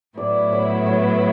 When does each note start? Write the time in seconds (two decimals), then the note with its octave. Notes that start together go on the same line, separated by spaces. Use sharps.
0.17 A2 F#3 B3 E4 D5
0.52 C#5
0.87 C#5